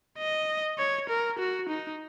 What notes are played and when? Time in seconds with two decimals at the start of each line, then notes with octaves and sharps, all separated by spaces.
0.18 D#5
0.78 C#5
1.09 A#4
1.39 F#4
1.69 D#4